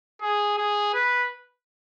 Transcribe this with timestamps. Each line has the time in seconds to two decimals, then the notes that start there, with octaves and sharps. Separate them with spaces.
0.21 G#4
0.58 G#4
0.94 B4